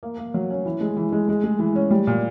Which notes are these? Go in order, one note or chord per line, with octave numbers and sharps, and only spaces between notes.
A#3
A#3
F#3
C#4
E3
G#3
E3
G#3
G#3
G#3
E3
C#4
G3
A#2